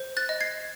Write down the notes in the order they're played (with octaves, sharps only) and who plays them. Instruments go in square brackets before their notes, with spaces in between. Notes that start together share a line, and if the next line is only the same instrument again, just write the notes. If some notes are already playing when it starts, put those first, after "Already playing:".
Already playing: [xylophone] C5
F#6 A6
D#5
G#6 C7